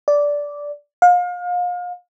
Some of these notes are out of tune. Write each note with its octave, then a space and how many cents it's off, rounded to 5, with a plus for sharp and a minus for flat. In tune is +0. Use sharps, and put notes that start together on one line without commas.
D5 -10
F5 +35